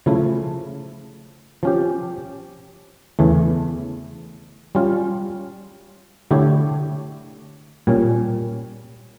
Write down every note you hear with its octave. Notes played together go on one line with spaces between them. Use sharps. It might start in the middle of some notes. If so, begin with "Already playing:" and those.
C#3 F3 A3 E4
F3 C#4 G4
E2 C#3 E3 A3
G3 C#4 F4
D3 A3 E4 G4 C#5
A#2 G3 C#4